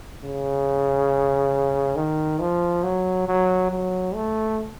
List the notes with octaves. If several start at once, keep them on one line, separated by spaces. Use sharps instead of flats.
C#3
D#3
F3
F#3
F#3
F#3
A3